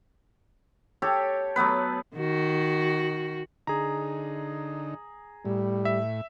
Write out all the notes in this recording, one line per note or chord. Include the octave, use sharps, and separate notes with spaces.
G4 A4 C#5
F#3 A3 B3 B4
D#3 F#4
D3 D#4 G#4 A#5
A2 G3
E5